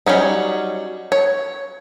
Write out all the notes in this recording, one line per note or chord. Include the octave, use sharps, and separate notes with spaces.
F#3 G3 C#4 D#4
C#5